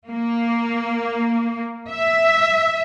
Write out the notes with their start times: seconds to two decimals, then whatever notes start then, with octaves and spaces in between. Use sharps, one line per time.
0.10 A#3
1.91 E5